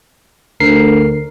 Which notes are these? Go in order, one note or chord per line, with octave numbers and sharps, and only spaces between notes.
D2 D3 A#4 C7